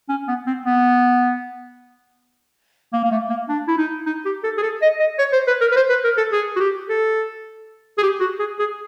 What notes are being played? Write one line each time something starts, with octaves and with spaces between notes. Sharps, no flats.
C#4
B3
C4
B3
A#3
A#3
A3
A#3
D4
E4
D#4
D#4
G4
A4
G#4
A4
D#5
D#5
C#5
C5
B4
A#4
B4
C5
B4
A#4
A4
G#4
F#4
G4
A4
G#4
G4
F#4
G#4
G#4